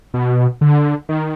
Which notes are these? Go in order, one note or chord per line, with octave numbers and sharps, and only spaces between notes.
B2
D3
D#3